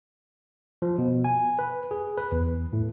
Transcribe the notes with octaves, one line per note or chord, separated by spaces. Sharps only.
F3
B2
G#5
B4
G#4
B4
E2
A2